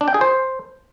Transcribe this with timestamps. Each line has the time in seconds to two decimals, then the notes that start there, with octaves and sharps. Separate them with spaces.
0.01 D4
0.08 G5
0.14 G#4
0.21 C5